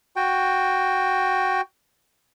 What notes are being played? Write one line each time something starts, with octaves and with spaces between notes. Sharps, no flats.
F#4 G5